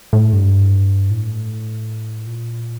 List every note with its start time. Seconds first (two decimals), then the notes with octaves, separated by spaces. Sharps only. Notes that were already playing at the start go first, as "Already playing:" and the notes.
0.13 A2
0.33 G2
1.10 A2
2.27 A#2